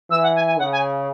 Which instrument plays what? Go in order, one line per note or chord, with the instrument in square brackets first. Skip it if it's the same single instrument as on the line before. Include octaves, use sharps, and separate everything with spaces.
[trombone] E3 [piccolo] E6
[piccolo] F#5
G#5
G#5
[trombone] C#3 [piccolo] F#5
[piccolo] G#5